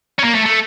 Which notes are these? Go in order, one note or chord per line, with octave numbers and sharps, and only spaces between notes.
C#4
A#3
A3
A3